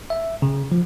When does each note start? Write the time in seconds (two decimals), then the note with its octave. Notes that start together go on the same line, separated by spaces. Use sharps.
0.10 E5
0.42 C#3
0.72 F3